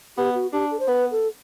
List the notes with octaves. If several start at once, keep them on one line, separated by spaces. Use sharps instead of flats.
B3 G4
F#4
D4 G4
A4
C5
B3 B4
A4